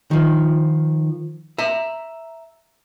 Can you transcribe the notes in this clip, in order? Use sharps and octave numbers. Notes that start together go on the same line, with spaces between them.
D#3 F3
E5 A#5